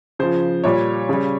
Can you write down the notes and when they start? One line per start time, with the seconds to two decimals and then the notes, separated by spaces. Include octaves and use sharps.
0.19 C#3 F3 C5
0.64 A#2 G3 C#5
1.09 C#3 G3